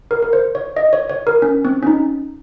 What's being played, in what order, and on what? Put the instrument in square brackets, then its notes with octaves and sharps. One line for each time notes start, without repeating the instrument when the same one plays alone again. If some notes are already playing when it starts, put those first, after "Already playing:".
[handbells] A#4
A#4
C5
C#5
D#5
C#5
C#5
A#4
C#4
C4
C#4
D#4